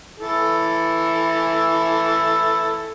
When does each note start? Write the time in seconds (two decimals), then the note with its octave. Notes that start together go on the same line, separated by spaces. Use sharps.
0.19 E3 E4 A4